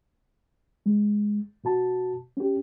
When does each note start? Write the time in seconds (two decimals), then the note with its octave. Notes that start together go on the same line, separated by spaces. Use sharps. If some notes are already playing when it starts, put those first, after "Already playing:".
0.86 G#3
1.64 B2 F#4 A5
2.37 C#4 G4